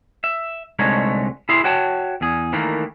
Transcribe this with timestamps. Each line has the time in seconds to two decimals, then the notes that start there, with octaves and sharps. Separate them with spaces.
0.24 E5
0.79 C2 D3 G#3 A3 D#4 C#5
1.49 E4 G#4 E5 C6
1.64 F#4 C#5 G5 A5
2.21 E2 G#4
2.53 D#3 E3 A3 A#3